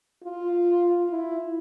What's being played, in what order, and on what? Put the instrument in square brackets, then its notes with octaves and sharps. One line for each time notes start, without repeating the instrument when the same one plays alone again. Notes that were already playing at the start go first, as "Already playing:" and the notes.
[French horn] F4
E4